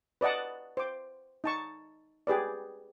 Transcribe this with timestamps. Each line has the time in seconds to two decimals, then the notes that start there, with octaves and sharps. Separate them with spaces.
0.21 B4 D5 D#5 F#5 A5
0.77 C5 D6
1.44 D#4 A5 C#6
2.27 G4 G#4 B4 D5